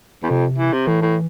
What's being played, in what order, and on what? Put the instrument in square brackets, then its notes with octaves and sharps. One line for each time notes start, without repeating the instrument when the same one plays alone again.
[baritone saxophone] E2
[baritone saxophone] F2 [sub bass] C3
[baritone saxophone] E3
C3
[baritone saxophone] A2 [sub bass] E3
[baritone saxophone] A2